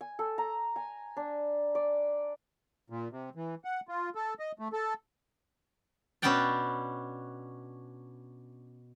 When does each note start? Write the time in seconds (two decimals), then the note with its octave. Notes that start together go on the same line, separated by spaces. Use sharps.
0.01 G#5
0.19 A4
0.38 A#5
0.76 G#5
1.17 D4
1.75 D5
2.90 A#2
3.12 C3
3.35 E3
3.65 F#5
3.89 F4
4.15 A4
4.39 D#5
4.59 A3
4.73 A4
6.22 B2 B3 C#4 D4 G5 A5